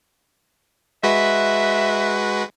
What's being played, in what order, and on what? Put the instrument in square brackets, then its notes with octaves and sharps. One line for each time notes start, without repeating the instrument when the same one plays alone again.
[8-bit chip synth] G#3 F#4 B4 [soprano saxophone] E5